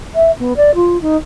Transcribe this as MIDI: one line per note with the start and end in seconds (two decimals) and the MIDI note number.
0.15 0.31 76
0.39 0.53 59
0.56 0.74 74
0.74 0.98 65
1.01 1.17 63